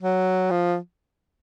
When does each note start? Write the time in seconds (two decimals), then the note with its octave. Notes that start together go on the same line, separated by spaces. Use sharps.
0.02 F#3
0.50 F3